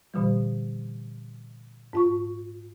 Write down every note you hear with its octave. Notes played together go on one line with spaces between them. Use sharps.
A#2 D3 E3 G3
G#2 F4 C#6